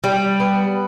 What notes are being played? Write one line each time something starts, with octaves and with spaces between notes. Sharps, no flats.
G3
B3